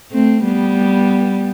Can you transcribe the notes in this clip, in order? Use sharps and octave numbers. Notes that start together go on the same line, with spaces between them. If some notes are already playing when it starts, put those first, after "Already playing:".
A3 C4
G3 B3